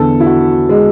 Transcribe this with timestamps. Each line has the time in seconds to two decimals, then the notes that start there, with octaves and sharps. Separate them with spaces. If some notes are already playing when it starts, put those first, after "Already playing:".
Already playing: E2 D3 A4
0.20 E4
0.26 F#4
0.69 G#3